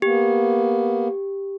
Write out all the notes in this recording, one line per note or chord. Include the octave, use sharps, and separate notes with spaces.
A#3 B3 G4